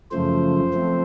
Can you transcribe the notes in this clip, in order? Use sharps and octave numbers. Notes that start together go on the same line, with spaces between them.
F#2 C#3 F3 A3 C5
F3 A3 C4